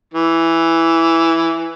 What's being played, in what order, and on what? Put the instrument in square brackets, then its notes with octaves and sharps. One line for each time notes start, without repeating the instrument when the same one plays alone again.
[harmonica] E3